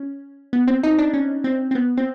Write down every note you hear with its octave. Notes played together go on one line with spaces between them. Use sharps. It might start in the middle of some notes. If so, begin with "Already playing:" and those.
Already playing: C#4
B3
C4
D#4
D4
C#4
C4
C4
B3
C4